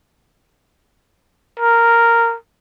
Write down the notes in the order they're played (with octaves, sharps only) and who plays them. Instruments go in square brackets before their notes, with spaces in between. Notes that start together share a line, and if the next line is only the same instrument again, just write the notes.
[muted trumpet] A#4